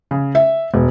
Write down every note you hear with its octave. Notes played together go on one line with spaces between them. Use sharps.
C#3
E5
E1